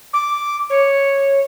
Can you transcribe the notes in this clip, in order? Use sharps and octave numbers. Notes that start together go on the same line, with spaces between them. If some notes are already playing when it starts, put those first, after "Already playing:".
D6
C#5